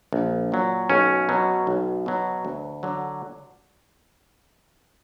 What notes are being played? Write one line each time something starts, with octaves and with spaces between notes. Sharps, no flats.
A#1
A#2 F#3
B1 C#4
B2 F#3
B1
B2 F#3
D2
D3 F#3